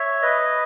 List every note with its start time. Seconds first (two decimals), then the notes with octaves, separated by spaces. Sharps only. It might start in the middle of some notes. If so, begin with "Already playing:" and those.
Already playing: C#5 E5
0.22 B4 D#5